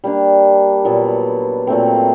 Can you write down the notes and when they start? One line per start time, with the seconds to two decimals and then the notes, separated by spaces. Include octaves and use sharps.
0.04 G3 A#3 D4
0.85 A#2 F#3 B3
1.67 A#2 F#3 A3 C4